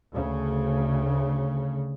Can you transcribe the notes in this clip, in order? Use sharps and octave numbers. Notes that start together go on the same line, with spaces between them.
D2 C#3